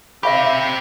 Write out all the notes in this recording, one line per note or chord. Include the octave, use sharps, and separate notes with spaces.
C4 G4 E5 F5 B5